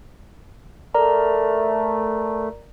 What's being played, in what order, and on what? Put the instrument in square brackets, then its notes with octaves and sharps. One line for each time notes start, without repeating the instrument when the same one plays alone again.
[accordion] A3 [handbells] A#4 D5 A#5